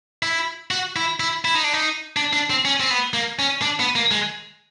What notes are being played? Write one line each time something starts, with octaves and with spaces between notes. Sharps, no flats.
E4
F#4
E4
E4
E4
D#4
D4
D#4
D4
D4
C4
C#4
C4
B3
A#3
C#4
D4
B3
A#3
G#3